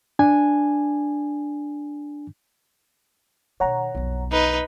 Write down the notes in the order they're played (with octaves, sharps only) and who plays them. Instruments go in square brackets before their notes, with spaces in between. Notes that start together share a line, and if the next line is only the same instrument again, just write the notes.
[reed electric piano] D4 G#5
[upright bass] B2 D#3 [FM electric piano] C#5 F#5 A#5
[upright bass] B1 F2
[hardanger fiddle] D#4 B4